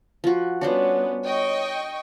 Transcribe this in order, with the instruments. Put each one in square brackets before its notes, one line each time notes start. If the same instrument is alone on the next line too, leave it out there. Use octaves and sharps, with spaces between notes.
[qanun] F3 F#4
[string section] G3 B3 C#4 [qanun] D4 F#4 C5 [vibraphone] C#5
[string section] D#5 G5 C#6